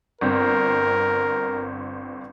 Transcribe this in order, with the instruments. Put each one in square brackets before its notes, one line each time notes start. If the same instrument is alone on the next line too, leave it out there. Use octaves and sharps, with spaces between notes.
[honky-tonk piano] G1 C4 [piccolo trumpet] A#4